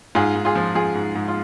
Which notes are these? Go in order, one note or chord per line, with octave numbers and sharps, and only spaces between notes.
G#2 F4 G#4
G#2
F4 G#4
F3
F3 F4 G#4
G#2
G#2
F4